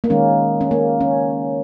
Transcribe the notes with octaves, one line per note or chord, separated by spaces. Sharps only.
A#3
D#3 G#3 C#4
C#4
A#3
C#4